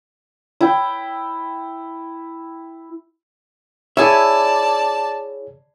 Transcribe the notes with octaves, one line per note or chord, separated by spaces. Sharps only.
E4 G5
E4 G#4 C#5 D5 E5 G#5 A5